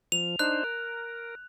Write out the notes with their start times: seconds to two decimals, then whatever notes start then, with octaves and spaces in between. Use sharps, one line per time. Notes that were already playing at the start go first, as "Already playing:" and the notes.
0.12 F3 F7
0.39 D4 D#4 C5 F#6
0.64 A#4